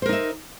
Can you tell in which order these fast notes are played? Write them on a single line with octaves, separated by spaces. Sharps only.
C5 A#4 D#4 E5